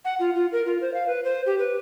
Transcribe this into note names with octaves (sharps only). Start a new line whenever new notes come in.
F#5
F4
F4
A#4
F4
C5
F5
B4
C5
G4
B4